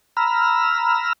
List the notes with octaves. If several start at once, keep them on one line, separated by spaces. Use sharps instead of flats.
A#5 B5 E6 F6